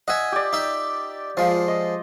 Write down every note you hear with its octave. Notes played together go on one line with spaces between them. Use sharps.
D#5 E5 F#5 G#5
G4 D5
D#4 E5
F3 G#3 F4
D#5